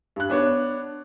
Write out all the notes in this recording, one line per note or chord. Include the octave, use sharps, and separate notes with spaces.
G2 F#6
B3 D4 C#5